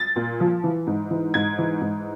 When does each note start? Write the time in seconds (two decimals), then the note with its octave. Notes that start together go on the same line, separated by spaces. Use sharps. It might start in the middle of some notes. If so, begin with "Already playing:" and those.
Already playing: A6
0.16 A#2
0.40 F3
0.64 E3
0.87 G#2
1.10 E3
1.34 G#2 G#6
1.58 E3
1.81 G#2